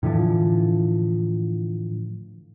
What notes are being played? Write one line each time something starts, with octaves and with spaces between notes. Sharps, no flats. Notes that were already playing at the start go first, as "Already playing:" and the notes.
A2 D3 E3 F3